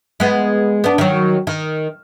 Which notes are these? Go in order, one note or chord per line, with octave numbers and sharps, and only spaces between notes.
G#3 B3
B3 D4
D#3 F#3
D#3